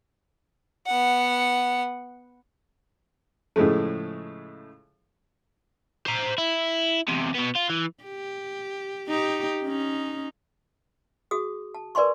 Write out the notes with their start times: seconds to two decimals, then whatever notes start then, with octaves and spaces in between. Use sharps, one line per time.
0.87 B3 F#5
3.56 A2 C#3 F3 G#3 A3
6.06 C5 A#5
6.38 E4
7.08 E2 C3
7.34 B2 B3
7.55 F4
7.69 E3
8.04 G4
9.09 D#4 G4
9.63 C#4 D#4
11.31 F#4 G#4 D#6
11.75 A5
11.95 A#4 B4 D5 G#5 C6 C#6